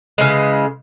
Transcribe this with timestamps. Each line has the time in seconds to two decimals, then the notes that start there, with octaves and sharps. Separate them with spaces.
0.18 C#3 E3 G#3